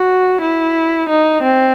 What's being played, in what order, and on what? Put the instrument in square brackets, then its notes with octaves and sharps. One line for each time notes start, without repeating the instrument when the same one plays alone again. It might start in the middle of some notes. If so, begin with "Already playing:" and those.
Already playing: [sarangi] F#4
E4
D#4
C4